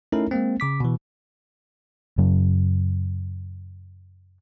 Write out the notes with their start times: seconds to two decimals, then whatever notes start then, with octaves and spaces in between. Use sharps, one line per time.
0.12 A3 C#4 D#4 E4 A4 A#4
0.31 G#3 A#3 C4
0.60 C#3 D6 B6
0.80 B2 E3
2.18 F#2 C#3 F#3